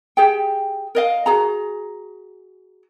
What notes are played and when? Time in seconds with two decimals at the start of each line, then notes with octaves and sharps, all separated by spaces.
0.17 G4 G#4 G5
0.95 A#4 D#5 F5
1.26 F#4 G#4 A#5